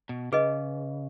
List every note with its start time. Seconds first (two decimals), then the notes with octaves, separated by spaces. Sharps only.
0.09 B2
0.32 C#3 G#4 B4 D#5